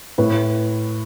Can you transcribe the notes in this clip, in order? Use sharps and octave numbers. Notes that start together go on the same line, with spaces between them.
A2 B4